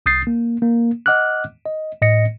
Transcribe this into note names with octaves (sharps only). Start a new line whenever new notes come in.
C2 D#6 G6 A6 C7
A#3
A#3
D#5 F#5 D6 F6 F#6
D#5
A2 D#5 A#6 C#7